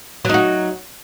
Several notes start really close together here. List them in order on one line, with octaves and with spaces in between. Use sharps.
F#3 D#4 F#4